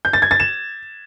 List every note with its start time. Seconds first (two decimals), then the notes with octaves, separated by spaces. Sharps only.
0.05 G6
0.13 A6
0.22 G#6
0.31 A6
0.40 E7